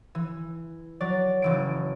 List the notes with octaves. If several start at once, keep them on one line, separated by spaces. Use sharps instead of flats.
E3
F#3 D5
F#1 E3 D7